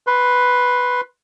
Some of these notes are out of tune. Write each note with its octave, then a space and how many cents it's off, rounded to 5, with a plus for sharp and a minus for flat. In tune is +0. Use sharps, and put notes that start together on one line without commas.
B4 +0 C6 +20